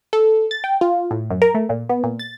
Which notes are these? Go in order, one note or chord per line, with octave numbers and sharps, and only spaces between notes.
A4
A6
G5
F4
A2
F#2
A#4
A3
A#2
B3
A#2
A6